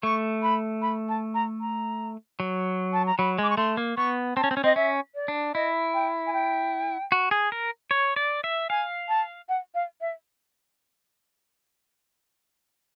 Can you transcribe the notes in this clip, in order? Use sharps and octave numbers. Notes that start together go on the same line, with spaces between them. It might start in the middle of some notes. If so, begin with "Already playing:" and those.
A3 C#6
B5
B5
A5
A#5
A#5
F#3
A5
A#5
F#3 B5
G#3 D6
C#6
A3 C6
A#3
B3 C#6
C4 A5
C#4
C4
C#4
C4 D#5
C#4 E5
D5
D4
E4 D#5
G5
G#5
G5
F#4
G#4
A#4
C#5
D5
E5
F5 G#5
A5
F#5
F5
E5